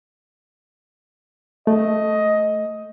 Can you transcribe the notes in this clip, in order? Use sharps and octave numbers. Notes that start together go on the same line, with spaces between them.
A3 D#5